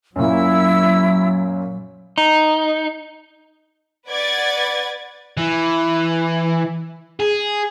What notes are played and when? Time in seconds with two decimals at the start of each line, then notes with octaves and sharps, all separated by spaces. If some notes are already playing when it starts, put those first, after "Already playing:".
0.16 F#2 A#2 F#3 E4 E6
2.18 D#4
4.08 B4 D5 F#5 G#6 A6
5.37 E3
7.20 G#4